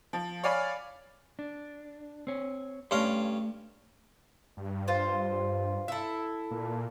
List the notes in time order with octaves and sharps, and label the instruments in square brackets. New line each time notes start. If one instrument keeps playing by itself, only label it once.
[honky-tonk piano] F3
C#5 D5 F5 G#5 B5
[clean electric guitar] D4
C4 C#5
[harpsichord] G2 C#4 F5 [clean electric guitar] A3 C6
[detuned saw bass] G2
[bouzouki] F4 C5
E4 A4
[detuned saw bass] A#2